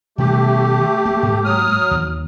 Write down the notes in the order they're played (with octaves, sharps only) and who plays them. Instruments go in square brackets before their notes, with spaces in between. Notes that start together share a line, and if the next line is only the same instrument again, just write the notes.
[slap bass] B2 D#3 G3 [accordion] A3 G4
[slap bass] A#3
G#2 G#3 A#3
[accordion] F#3 D#6 F6
[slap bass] D#2